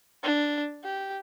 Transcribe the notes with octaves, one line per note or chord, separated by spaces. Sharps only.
D4
G4